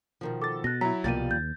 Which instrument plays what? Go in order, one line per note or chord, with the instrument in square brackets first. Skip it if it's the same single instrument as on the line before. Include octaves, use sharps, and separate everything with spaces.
[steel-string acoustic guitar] B2 D#3 F3
[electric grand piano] A4 A6 [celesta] D6
[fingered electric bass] B2 [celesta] F#6 A#6
[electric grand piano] F#3 E4 [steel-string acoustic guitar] A#5 [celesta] B6
[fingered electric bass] C2 B2 [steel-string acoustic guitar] F3 G3 A#3 [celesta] G4 D#7 [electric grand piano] A6
[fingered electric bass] D#2 [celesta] G6